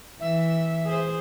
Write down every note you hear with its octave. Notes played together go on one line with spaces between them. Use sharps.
E3 E5
G#4 C5